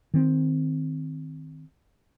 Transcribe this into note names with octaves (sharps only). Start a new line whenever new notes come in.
D#3 C4